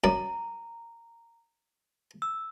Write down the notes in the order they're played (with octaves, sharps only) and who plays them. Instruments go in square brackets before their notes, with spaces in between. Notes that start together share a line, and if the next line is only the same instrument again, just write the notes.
[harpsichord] F#2 D5 [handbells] A#5
[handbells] E6